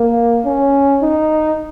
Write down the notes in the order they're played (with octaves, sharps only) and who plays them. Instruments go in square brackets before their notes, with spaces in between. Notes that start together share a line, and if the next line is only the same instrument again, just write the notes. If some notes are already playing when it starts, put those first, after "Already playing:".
Already playing: [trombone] A#3
C#4
D#4